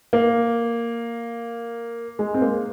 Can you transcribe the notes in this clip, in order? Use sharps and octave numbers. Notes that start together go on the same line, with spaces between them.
A#3
G#3
C4
A#3